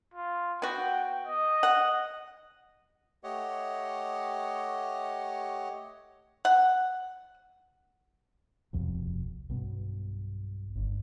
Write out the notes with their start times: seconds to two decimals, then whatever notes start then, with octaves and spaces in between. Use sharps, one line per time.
0.14 F4
0.62 B3 F#4 G5
1.27 D#5
1.63 F#5
3.24 A3 G4 C#5 D#5 F#5
6.45 F#5
8.73 D#1 B1 F2 C3
9.50 B1 G2 B2
10.75 G1 G2